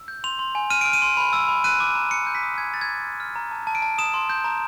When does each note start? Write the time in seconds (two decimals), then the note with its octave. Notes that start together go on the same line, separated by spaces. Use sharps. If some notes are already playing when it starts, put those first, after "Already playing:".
Already playing: E6
0.08 G6
0.24 C6 F7
0.39 C6
0.55 G#5
0.70 F6 D#7
0.81 F6 D7
0.93 D#7
1.02 C6
1.17 B5
1.33 E6
1.48 B5
1.64 F#6 D#7
1.80 D6
1.96 A#5
2.11 A#5 C#7
2.27 G6
2.35 B6
2.43 D#6
2.57 G#5 G#6
2.73 B5 A6
2.81 G#6
2.89 D6
3.05 F6
3.20 F6
3.36 A#5
3.51 A5
3.67 A5
3.75 D7
3.82 A5
3.98 D#6 E7
4.14 C6
4.29 G6
4.44 A#5